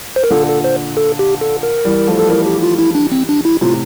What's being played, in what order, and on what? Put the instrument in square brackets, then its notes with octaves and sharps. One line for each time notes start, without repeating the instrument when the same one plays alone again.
[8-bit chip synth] C5
A#4
[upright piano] A#2 D3 [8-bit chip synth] A4
[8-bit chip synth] A4
C5
A4
G4
A4
A#4
[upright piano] E3 G3
F3 A3
[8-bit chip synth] A4
[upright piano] E3 G3 [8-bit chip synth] A#4
[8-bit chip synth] G4
F4
E4
D4
C4
D4
E4
[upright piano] A2 C3 [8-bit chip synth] F4